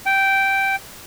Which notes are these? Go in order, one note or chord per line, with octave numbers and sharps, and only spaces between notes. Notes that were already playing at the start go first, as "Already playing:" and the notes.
G5